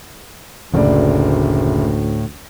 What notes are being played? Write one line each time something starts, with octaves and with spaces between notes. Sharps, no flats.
F#1 D2 A2 D5